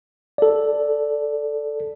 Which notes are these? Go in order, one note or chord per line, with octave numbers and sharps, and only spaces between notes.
A4 D5